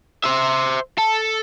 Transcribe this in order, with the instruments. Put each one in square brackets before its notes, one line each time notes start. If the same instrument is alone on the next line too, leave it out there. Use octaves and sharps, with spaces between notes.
[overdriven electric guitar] C5 E5
A4